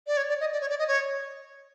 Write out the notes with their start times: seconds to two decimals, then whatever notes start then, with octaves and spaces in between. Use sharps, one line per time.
0.07 D5
0.17 C#5
0.29 D5
0.40 D#5
0.53 D5
0.61 C#5
0.70 D5
0.79 D#5
0.88 C#5